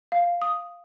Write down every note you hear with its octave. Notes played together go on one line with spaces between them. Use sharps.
F5
D#6